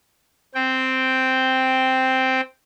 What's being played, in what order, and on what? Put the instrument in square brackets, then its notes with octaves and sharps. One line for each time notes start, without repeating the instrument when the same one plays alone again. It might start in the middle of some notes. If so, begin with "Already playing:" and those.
[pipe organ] C4 G5